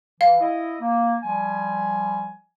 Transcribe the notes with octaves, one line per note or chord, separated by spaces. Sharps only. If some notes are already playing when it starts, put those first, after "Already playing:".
E3 F5
E4 D#5
A#3
F3 G3 G#5